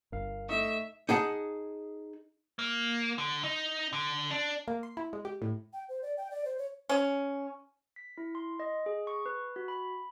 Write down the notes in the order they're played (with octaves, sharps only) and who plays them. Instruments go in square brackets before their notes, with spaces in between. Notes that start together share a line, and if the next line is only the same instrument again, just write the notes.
[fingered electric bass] G1 G2 [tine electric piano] A#4 F5
[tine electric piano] A3 C#6 [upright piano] D#4 [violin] E5
[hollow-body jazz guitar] D#4 G#4 F#5 A5
[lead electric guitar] A#3
D3
D#4
D3
D4
[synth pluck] A#3
C6
E4
G#3
G4
A2
[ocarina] G5
C5
D5
G5
D5
C5
C#5
[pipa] C#4
[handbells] B6
E4
C6
D#5
G#4
C#6
B4
F#4
B5